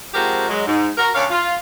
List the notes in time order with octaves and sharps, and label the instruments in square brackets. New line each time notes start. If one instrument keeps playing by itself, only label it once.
[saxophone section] F3 G#3 C4 F#4 G4 A#4
F#3 G#3
G#2
F#4 A#4
D2 C#4 C#5 D5 F5
F4